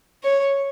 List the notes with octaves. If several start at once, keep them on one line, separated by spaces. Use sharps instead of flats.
C#5